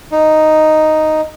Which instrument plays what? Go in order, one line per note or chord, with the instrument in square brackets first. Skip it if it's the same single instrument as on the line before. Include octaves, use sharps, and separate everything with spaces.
[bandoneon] D#4